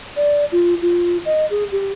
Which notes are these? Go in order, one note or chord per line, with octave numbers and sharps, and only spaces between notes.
D5
F4
F4
D#5
G#4
G4